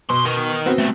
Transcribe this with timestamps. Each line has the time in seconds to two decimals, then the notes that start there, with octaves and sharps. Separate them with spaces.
0.10 B2 C6
0.25 D#4 A#4
0.66 B3 C4 F#4
0.78 G3 A3